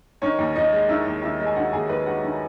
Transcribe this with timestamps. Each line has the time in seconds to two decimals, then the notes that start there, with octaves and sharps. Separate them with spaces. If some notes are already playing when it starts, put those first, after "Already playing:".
0.22 D#3 C#4 C#5
0.39 D#2
0.55 D#2 D#4 D#5
0.72 G#3
0.89 D#3 E4 E5
1.06 D#2
1.22 D#2 E4 E5
1.40 G#3
1.46 G#5
1.56 D#3 F#4 F#5
1.73 D#2 G#4 G#5
1.89 D#2 B4 B5
2.06 G#3 F#4 F#5
2.24 D#3